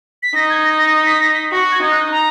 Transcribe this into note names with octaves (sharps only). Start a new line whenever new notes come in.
B6
D#4 A#6
G#6
A#6
A#6
B6
A#6
B6
F#4 A#6
G#6
D#4
F#6
A#5